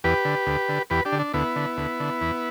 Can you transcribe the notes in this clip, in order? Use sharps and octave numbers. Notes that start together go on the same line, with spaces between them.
E2 G4 B4
D3
D2
D3
E2 G4 B4
D4 G4
D3
D4
D2 B3 E4
D3
D2
D3
E2